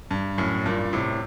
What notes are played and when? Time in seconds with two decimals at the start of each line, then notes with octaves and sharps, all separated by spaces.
0.11 G2
0.38 F#2 A2
0.66 G2 A#2
0.93 A2 C3